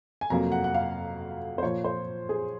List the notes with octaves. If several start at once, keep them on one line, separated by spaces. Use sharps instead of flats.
G#5
F2 C3 F#3 A#3 A#5
F#5
F#5
F5
C5
A#2 F3 A#3 C#5
C5
G#4